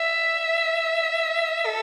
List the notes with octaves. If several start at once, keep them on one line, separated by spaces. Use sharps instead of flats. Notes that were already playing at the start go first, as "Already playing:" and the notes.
Already playing: E5
A4